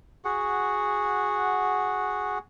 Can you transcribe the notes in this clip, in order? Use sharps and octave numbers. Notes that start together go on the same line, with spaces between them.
F#4 G#4 F#5